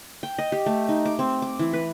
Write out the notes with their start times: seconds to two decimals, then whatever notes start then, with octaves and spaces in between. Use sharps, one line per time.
0.23 G5
0.38 D#5
0.52 G4
0.66 A3
0.89 D#4
1.06 D6
1.19 C4
1.42 D6
1.59 E3
1.73 B4